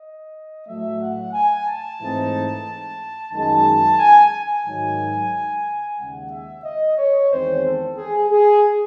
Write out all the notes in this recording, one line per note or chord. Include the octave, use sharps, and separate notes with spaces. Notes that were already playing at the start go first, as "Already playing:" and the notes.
Already playing: D#5
A2 F#3 A3 E5
F#5
G#5
A5
G#2 E3 A3 C4 D#4
F#2 D#3 G#3 D#4 A5
G#5
G#5
G#2 D#3 F#3
D#2 C#3 G#3 F#5
E5
D#5
C#5
E2 D#3 G#3 C4 C5
A4
G#4
G#4